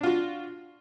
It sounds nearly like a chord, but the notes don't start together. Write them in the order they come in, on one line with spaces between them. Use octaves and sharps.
D4 F4 F#4